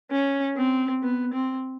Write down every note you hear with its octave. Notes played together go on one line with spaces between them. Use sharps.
C#4
C4
B3
C4